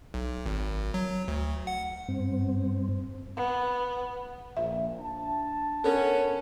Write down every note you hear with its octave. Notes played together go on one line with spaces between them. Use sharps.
B1
G#1
F#3
D2
F#5
G2 C4
B3
A#1 A#2 E5
D4 A5
B3 C#4 A4 A#4